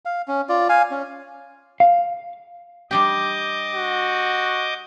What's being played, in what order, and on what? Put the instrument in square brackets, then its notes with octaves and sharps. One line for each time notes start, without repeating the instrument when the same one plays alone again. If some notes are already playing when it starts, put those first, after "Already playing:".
[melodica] F5
C#4
F4 D5
F5 G#5
C#4
[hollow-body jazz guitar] F5
[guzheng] G3 D4 G4 [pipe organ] D#5 D6 G6
[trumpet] F#4